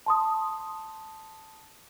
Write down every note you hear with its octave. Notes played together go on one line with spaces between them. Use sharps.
A5 C6 D#6